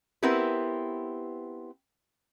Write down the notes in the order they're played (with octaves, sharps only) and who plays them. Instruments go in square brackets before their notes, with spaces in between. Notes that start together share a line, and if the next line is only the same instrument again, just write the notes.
[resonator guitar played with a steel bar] B3 C4 E4 G4 A#4 B4